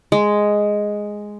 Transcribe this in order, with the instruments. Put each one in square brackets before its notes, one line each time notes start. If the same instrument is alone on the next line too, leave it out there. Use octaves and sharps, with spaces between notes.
[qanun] G#3